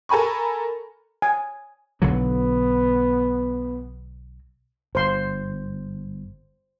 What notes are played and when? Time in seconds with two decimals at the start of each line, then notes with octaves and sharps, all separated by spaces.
0.09 A4 A#4 G#5 B5 C#6
1.22 G#5
2.02 B1 D3 F#3 B3
4.95 G1 C5 C6